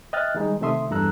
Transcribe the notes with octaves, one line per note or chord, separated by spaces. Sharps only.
D#5 E5 G5 F6 F#6 A6
D#3 G3 G#3 D#4
C3 D#3 A3 E5 C6 D#6
E2 G2 A4 A#5 E6 F#6